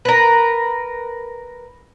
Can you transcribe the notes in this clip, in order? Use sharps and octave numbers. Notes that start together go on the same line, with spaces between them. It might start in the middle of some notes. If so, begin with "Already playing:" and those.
A#4 B4